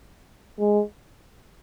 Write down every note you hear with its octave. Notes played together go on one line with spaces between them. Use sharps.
G#3